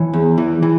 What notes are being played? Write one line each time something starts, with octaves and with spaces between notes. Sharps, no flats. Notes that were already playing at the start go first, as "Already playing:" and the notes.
Already playing: E3 C#5
E2
E3
E3